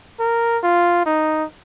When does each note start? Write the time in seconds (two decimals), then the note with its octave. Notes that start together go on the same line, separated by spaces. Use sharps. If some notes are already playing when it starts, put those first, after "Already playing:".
0.20 A#4
0.63 F4
1.06 D#4